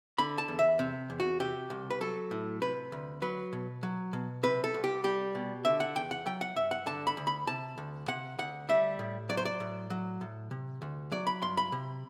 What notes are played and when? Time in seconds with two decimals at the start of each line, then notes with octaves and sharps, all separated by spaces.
0.18 D3 B5
0.38 A5
0.48 E2
0.59 E5
0.79 C3
1.10 E2
1.20 F#4
1.40 C3 G4
1.70 C2
1.90 B4
2.01 F#3 A4
2.31 A2
2.62 C3 B4
2.92 D2
3.22 F#3 B4
3.53 B2
3.83 F#3
4.13 B2
4.43 C3 B4
4.64 A4
4.74 C2
4.84 G4
5.04 G3 G4
5.35 B2
5.65 D3 E5
5.80 F#5
5.95 E2 G5
6.11 F#5
6.26 F#3 G5
6.41 F#5
6.56 G2 E5
6.71 F#5
6.86 D3 A5
7.07 B5
7.17 D2
7.27 B5
7.47 C3 A5
7.78 D2
8.08 C3 F#5
8.39 D2 F#5
8.69 G3 E5
8.99 A2
9.29 F#3 D5
9.37 C5
9.45 D5
9.60 A2
9.90 F#3
10.21 A2
10.51 C3
10.82 D2
11.12 F#3 D5
11.27 B5
11.42 G2 C6
11.57 B5
11.72 C3